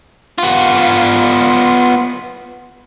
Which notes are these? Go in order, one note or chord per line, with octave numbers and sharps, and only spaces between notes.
B3 F4